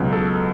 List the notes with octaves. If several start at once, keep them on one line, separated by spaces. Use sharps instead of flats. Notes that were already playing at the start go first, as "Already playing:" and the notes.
Already playing: C#2 B2 F#3
A4